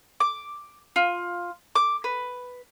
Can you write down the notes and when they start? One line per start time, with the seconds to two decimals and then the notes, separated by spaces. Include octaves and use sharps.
0.20 D6
0.96 F4
1.75 D6
2.04 B4